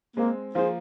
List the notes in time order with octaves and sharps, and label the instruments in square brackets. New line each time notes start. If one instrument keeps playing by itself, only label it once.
[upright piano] G#3 C4 [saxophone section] A#3
[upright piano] F3 A#3 [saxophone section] G#4 C5